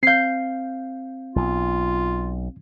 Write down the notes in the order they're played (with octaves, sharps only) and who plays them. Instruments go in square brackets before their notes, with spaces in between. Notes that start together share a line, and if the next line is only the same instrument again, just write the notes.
[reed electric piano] C4 F5 [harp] G6 C7
[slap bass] B1 [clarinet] F4